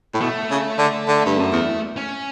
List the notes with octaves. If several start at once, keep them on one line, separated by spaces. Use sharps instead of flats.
A2
B2 A3
C#3
D3
D3
G2
F#2
E2
C#4